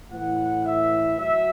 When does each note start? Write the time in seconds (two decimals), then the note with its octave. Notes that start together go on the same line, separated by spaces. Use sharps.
0.12 A2 E3 F#5
0.66 E5
1.20 F#3 E5